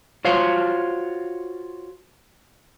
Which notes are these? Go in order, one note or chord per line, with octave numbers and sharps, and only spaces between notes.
F4 F#4 C5 C#5 F5